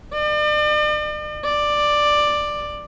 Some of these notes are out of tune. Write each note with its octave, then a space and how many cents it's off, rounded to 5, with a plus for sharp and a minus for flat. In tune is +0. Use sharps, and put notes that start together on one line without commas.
D5 +40
D5 +10